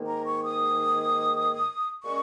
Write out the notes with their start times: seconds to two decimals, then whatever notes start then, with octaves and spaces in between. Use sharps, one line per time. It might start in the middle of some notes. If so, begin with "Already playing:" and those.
Already playing: G#2 D#3 A#3
0.08 A#5
0.26 C#6
0.44 D#6
2.03 A#2 G#3 C#4 C#6